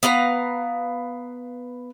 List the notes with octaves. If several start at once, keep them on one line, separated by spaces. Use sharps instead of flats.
B3 B4 F5 A#5